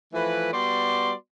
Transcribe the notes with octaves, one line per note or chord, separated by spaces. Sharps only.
E3 F3 A3 E4 B4
G3 B3 F#4 D5 C6